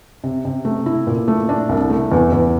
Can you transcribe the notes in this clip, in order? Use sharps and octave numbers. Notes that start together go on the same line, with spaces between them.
C3
C3
A3
E4
A#2
A3
D4
C2
A3
E2
E2